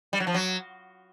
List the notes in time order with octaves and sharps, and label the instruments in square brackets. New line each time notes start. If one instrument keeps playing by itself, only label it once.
[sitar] G3
F#3
F3
F#3